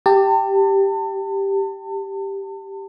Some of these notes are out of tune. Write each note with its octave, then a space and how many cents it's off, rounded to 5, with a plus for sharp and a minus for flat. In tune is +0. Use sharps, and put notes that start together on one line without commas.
G4 +0 A5 +35